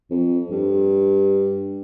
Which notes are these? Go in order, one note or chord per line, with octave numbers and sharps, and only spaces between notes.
F2
G2